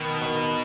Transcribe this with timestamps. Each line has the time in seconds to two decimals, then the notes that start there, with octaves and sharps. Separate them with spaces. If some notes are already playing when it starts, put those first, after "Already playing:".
Already playing: B2 D#3
0.21 D#3